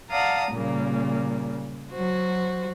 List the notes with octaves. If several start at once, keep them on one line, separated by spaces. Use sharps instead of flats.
D5 F5 F#5 A5 A#5 D#6
A#2 C#3 G3 A#3
F#3 F#4 C5